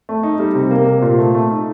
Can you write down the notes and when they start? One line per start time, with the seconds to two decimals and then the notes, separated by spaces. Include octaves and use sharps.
0.09 A3
0.23 D#4
0.39 G3
0.55 C3
0.71 A#3
0.87 C3
1.02 A#2
1.18 A3
1.35 A3
1.50 D#4